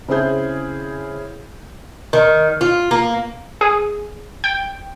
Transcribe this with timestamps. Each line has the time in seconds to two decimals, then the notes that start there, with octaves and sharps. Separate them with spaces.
0.08 C#3 C4 E4 G#4 G6
2.13 D#3
2.61 F4
2.91 A#3
3.61 G#4
4.44 G5